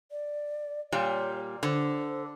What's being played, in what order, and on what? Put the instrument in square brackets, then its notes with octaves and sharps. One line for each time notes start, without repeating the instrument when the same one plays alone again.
[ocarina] D5
[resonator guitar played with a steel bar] A#2 G3 [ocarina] C#5
[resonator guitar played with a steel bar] D3 [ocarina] C5